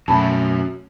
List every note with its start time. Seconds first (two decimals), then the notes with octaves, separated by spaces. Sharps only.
0.08 F#2 B2 F#3 A3 C#4 E5 A5 B5